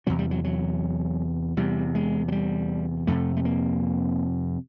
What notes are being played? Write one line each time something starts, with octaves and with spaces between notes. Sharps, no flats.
E2 C3 F#3
G3
F#3
F#3
E2 C3 G3
G#3
F#3
G3
F2 C3 A3
A3
A#3